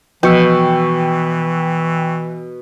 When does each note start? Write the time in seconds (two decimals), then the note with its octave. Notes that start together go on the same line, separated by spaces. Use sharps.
0.23 B2 E3 F3 G5 C#6 E6